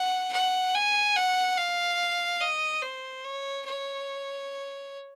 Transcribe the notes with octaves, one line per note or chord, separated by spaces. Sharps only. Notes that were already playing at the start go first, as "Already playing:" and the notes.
Already playing: F#5
F#5
G#5
F#5
F5
D#5
C5
C#5
C#5